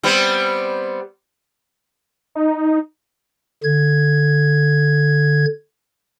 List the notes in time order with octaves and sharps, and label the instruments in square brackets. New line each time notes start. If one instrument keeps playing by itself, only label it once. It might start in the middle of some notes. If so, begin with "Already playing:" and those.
[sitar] G3 B3 C4
[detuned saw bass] D#4
[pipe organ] D3 G#6